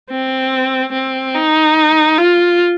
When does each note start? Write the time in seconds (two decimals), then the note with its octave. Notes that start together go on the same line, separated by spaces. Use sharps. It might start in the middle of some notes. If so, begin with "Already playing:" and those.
0.10 C4
0.92 C4
1.35 D#4
2.17 F4